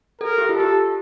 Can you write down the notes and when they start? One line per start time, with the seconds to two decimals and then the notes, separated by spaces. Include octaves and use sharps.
0.21 A4 A#4
0.38 G4
0.49 F4
0.55 A4
0.60 G4